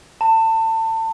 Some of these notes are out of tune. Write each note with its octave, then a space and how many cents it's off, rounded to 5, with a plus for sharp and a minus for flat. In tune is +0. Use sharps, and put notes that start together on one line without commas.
A5 +30